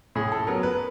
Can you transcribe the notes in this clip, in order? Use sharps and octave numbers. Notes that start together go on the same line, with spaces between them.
A2 G#4
A4
F#3 B3 A#4
B4